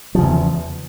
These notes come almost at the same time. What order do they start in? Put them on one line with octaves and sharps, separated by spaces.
F3 C#3 E2